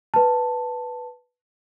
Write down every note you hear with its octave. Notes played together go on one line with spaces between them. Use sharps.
B4 A5